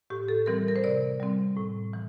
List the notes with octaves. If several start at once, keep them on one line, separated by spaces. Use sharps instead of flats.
A2 G4
A4
E3 G3 C4 A#4
A#4
C5
C3 D5
G3 C4
A2
E3